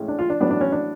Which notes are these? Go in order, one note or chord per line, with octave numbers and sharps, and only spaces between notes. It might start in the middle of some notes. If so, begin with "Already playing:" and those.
Already playing: A2 G#3 C#4
D4
F4
D4
A2 F#3 B3 D4
D4
C#4
D4